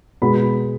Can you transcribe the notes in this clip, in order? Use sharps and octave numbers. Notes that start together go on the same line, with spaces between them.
B2 G#3 B3 B5